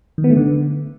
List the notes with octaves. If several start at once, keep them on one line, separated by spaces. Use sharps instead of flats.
D#3
B3
A3
D3